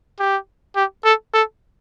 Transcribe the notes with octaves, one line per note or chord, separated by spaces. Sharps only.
G4
G4
A4
A4